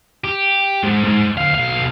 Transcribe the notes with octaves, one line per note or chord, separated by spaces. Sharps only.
G4
G#2
G#2
D2 F5
B1 F5